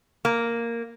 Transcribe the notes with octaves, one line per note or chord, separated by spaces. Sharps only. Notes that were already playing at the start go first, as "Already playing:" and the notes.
A#3